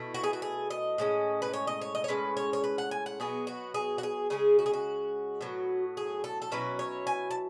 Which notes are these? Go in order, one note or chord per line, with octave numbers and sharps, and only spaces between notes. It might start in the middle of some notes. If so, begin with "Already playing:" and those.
Already playing: B2 A3 E4
F#4
G#4
F#4
G#4
D#5
A2 G#3 C#4
B4
C#5
D#5
C#5
D#5
C#5
A2 G#3 C#4 B4
C#5
C#5
B4
F#5
G#5
F#5
B2 F#3 B3 G#4
F#4
G#4
F#4
G#4
C#3 G#3 C#4 G#4
F#4
G#4
F#4
A2 F#3 B3
G#4
A4
A4
B2 F#3 C#4 E4 B4
C#5
G#5
A5